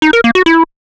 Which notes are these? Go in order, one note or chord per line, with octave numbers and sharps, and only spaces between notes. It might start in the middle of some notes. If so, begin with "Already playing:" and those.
D#4
A#4
A#3
F#4
E4